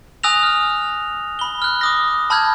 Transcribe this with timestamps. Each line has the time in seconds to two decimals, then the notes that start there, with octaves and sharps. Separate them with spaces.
0.23 G#5 D#6 E6 F#6 A#6 F7
0.43 F6
1.39 B5 G7
1.62 F6 F#6
1.81 D6 D#6 A#6
2.30 A5 B5 E6 F6 G6 G#6